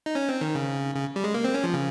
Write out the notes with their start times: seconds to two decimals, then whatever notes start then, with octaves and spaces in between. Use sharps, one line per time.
0.06 D#4
0.15 C#4
0.29 C4
0.41 D#3
0.55 C#3
0.95 C#3
1.16 G3
1.24 G#3
1.34 A#3
1.44 C4
1.54 C#4
1.64 F3
1.73 C#3